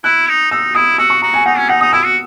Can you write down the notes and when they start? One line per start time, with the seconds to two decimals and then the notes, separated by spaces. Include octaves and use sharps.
0.04 E4 F#6
0.28 D#4
0.51 D#4 E6
0.75 E4 D#6
0.98 F#4 E6
1.10 C#6
1.22 F#4 A#5
1.34 G#5
1.45 D#4 F#5
1.58 C#4
1.69 D#4 F#5
1.81 D#4 D#6
1.93 E4 E6
2.05 F#4